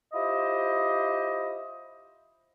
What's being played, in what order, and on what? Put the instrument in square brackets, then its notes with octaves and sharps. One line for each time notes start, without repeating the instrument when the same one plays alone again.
[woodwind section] E4 F4 G4 C5 D#5